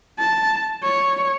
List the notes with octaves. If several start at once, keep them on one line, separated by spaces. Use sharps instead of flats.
A5
C#5